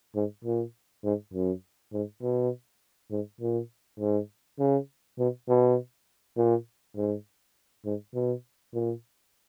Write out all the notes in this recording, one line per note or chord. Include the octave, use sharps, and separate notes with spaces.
G#2
A#2
G#2
F#2
G#2
B2
G#2
A#2
G#2
C#3
B2
B2
A#2
G#2
G#2
B2
A#2